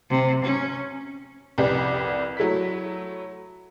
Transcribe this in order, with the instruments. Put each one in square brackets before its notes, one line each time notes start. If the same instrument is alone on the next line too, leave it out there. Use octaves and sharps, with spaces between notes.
[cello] C3
C#4
[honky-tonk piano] C2 F2 G4 B4 D5
F#3 A3 E4 B6